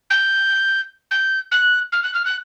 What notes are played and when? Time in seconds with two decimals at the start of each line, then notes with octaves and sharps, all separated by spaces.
0.10 G6
1.10 G6
1.51 F#6
1.92 F6
2.03 F#6
2.13 F6
2.25 F#6